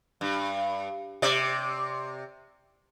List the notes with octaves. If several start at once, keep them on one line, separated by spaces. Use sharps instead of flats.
G2
C3 D5